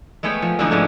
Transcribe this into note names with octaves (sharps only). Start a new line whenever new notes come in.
G#3 A3 B3 C#5 G5
F3
D3 E3 A3 B3 D4 D#4
G#2 D3 F3 G#3 A3 C#4